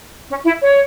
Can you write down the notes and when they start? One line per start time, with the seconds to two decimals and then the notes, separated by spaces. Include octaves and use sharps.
0.29 C#4
0.44 E4
0.60 C#5